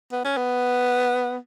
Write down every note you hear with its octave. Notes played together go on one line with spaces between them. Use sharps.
B3
C#4
B3